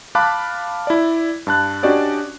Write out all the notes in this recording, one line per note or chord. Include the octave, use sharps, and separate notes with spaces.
F5 A5 B5 D6 F#6
E4 D5
G2 A5 F#6
C#4 D4 F#4 G4 D5 D#5